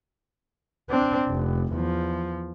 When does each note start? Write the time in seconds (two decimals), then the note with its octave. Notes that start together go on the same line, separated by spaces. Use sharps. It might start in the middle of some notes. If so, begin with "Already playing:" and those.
0.90 C4 D4
1.29 F1
1.74 E2 F3